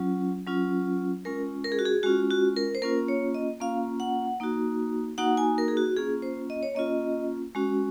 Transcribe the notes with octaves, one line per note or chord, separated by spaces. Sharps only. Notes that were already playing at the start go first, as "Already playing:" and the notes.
Already playing: F#3 C#4 F4
F#3 C#4 F4
G#3 C#4 F4 A#4
A#4
G#4
F#4
G#4
G#3 C#4 F4 F#4
F#4
A#4
C5
A#3 C#4 F4 A#4
C#5
D#5
A#3 C#4 F4 F5
F#5
A#3 D#4 F#4
A#3 D#4 F#4 F#5
G#5
A#4
G#4
F#4
A#3 C#4 F4 G#4
C5
D#5
C#5
A#3 C#4 F4 D#5
G#3 C#4 F#4